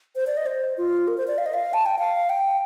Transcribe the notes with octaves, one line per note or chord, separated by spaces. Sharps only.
C5
D5
D#5
C5
F4
A#4
C5
D5
F5
D#5
F5
A5
G5
F5
G5